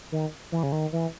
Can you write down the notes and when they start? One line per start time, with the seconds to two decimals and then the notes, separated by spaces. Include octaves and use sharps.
0.12 D#3
0.52 E3
0.63 C#3
0.72 D#3
0.93 E3